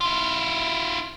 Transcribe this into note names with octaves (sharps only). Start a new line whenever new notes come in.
E4 F4